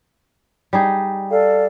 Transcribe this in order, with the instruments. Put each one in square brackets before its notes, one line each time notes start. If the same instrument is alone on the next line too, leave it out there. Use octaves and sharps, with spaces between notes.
[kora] G3 D#4 G#4
[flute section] A4 D5 F5